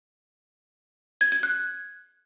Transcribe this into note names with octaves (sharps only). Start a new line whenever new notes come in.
G#6
G#6
F#6